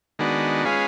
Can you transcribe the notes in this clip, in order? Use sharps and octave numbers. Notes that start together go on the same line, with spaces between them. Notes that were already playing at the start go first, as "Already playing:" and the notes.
D#3 G#3 B3 D4 F#4
G#3 C#4 F4 G#4 B4